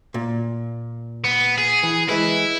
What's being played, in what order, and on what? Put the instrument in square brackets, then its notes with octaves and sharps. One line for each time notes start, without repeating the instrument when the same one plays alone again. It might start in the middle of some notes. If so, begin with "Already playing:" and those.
[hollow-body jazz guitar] A#2
[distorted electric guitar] B3
G#4
[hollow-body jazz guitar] E3
[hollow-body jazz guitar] E3 G#3 B4 [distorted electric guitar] E4